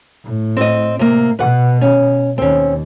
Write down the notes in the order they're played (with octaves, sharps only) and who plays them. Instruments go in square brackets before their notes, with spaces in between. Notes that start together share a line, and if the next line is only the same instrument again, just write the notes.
[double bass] A2
[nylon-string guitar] C4 D#5
C3 A#3
[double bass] B2 [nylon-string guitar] B4 F#5
[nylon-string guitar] C#4
[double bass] D#2 [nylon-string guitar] C4 C#4